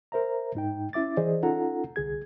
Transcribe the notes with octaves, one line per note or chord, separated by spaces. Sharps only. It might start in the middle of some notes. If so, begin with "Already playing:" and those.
A#4 C5 E5 A#5
G#2 D#4 G5
C#4 E4 E5 D6 A6
E3 G#4 C5 D5 D#5
C#4 D#4 F4 A4 F#5 A#5
C2 D3 G#4 G#6